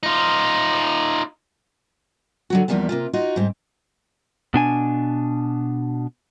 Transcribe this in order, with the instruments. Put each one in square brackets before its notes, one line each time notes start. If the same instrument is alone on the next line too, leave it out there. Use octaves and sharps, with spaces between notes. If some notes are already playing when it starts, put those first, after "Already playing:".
[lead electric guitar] D#4 F4
[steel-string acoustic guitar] D3 F#3 F#4
E2 D3 F3 G3 A#3 B3
C3 A#3 F4
D#4 F4 F#4
G#2 G3 C4
[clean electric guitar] B2 D4 G#5